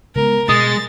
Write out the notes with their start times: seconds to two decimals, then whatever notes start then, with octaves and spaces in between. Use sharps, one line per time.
0.16 C#3 G#3 B3 A#4
0.49 B2 G#3 D#6 A6